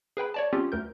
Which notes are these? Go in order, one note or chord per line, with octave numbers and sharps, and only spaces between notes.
G#4 B4 G5 B5
C#5 D5 A5
C4 C#4 F4 G4
D2 A#4 G6